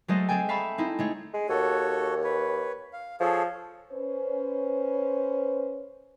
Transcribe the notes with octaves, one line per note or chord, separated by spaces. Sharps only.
F#3 G#3 A3 A4 C5 D#5
C4 G#4 A4 G5 G#5
E5 F5 A5 B5 C#6
C4 D#4 E4
G#3 A3 C#5
G#3
D#2 F#4 A4 C#5
B4 C#5
F5
F3 G#4 A4 C#5
C#4 B4 C5